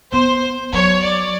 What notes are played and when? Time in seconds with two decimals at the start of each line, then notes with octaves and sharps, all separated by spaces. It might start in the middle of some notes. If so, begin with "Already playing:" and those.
0.12 B3 C5
0.73 F#3 C#5
1.02 D5